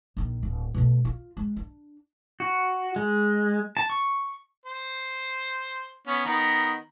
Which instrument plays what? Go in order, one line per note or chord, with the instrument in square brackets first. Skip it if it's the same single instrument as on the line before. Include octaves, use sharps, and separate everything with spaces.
[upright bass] A#1 D#3
D1
B2 A3
F4
G#3
D4
[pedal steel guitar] F#4
G#3
A5
C#6
[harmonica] C5
B3 C#4
D#3 B3 A#5